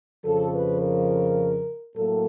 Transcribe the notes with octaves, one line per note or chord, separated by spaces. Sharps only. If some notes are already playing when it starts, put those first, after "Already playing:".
F2 C#3 F3 A4
B4
A#4
A2 F#3 A#3 A4